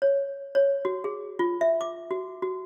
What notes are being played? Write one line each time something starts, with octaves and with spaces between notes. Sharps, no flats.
C#5
C#5
F#4
G#4
F4
E5
D6
F#4
F#4